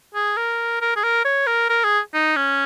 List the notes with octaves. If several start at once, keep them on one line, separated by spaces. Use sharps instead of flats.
G#4
A#4
A#4
G#4
A#4
C#5
A#4
A#4
G#4
D#4
C#4